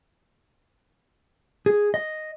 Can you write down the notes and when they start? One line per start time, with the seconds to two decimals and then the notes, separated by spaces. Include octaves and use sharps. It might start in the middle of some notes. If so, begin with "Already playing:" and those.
1.66 G#4
1.94 D#5